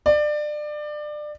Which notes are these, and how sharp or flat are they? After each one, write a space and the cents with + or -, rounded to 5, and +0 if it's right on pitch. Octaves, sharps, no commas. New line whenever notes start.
D5 +25